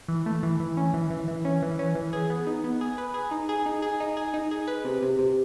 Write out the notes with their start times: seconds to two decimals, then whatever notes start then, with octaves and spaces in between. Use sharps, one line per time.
0.08 E3
0.26 A3
0.43 E3
0.60 E3
0.77 C#4
0.94 E3
1.10 E3
1.28 E3
1.45 C#4
1.62 E3
1.79 C#4
1.95 E3
2.13 G#4
2.30 B3
2.47 D#4
2.64 B3
2.81 G#4
2.98 B4
3.14 G#4
3.31 D#4
3.49 G#4
3.66 D#4
3.82 G#4
4.00 D#4
4.17 G#4
4.34 D#4
4.51 G#4
4.67 B4
4.85 C3
5.02 C3
5.19 C3